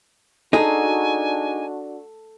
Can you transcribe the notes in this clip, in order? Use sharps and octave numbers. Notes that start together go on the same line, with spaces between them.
D4 D#4 F#4 G#4 A4 G#5